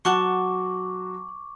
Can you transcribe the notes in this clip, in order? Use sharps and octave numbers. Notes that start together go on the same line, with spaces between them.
F#3 F#4 F#5 A5 C#6 D6 F#6